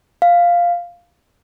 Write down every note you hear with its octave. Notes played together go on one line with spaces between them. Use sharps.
F5